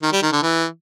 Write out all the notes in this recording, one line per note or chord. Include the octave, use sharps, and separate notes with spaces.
D#3
G3
D#3
D3
E3